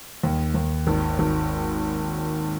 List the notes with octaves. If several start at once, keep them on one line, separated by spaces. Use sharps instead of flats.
D#2
D#2
G#1
G#1